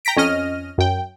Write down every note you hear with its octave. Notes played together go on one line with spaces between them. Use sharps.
G5 A#5 A#6 B6 D7
F2 C#4 D#5 F6 A#6 D#7
F#2 G5